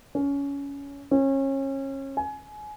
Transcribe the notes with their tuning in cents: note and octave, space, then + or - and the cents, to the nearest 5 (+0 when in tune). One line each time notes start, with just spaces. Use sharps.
C#4 +20
C#4 -30
G#5 +25